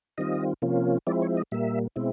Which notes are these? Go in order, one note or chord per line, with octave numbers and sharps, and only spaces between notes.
D#3 G3 C4 F4 D#5
C3 F3 A#3 C#4 F4
F3 G#3 C4 E4 D5
C#5
D#5
A#2 G3 A#3 E5
B2 G#3 C4 E4